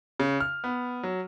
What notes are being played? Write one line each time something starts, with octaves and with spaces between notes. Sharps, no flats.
C#3
F6
B3
F#3